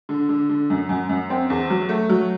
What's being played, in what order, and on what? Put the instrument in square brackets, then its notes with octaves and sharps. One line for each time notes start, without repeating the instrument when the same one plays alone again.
[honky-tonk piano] D3
D3
D3
F#2
F#2
F#2
C4
E2
F#3
A3
F#3